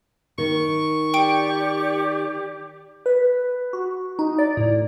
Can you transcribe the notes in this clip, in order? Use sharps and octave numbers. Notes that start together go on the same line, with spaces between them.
D#3 C#6
G4 D5 G5 D6 D7
B4
F#4
D#4
D5
A2